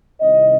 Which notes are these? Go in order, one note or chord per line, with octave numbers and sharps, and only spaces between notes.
C2 C3 D#3 D#5